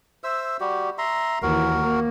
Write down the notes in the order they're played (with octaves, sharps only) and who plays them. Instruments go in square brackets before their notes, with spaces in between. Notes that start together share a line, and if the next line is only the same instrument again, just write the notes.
[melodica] C5 E5 E6
G3 F#4 G4
E5 A#5 C6
[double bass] D#2 E3 [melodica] F#4 A#4
[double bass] A#3